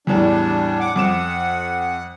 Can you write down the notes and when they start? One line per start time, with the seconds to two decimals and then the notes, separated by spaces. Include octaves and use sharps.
0.07 E2 A2 E3 G3 D4
0.80 F#5 D6
0.96 F2 F#5 D6 E7